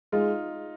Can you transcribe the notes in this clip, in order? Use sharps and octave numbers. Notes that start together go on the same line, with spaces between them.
G#3 D#4 F4